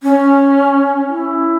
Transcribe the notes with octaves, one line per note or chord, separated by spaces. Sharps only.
C#4
E4